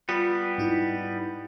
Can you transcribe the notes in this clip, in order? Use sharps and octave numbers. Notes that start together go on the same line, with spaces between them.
G3 B3 F4
G#2 D#4 E4